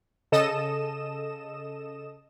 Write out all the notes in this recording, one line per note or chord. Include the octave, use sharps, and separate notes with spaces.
C#3 A4 D#5 D#6 E7